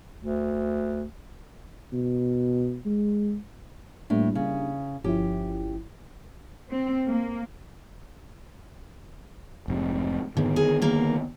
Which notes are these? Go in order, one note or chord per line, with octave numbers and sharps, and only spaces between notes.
D2
B2
G#3
A2 G3 A#3 D4
C#3
G1 F3 C#4 E4 G4
C4
A#3
F1 G#2 C3
G#2 D3 D#3 B3
G#4 A#4
A#3 A#4